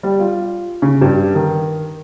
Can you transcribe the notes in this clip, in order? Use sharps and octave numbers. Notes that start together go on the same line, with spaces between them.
G3
F4
C#3
G2
D#3